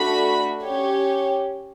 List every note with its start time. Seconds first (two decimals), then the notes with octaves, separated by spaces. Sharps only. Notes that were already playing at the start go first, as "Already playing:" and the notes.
Already playing: A3 D4 F#4 B5
0.63 C#4 G4 C#5